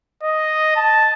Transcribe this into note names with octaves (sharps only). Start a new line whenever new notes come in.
D#5
A5